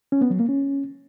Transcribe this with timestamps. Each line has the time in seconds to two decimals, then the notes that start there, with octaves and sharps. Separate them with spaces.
0.12 C#4
0.21 B3
0.30 F#3
0.40 A#3
0.49 C#4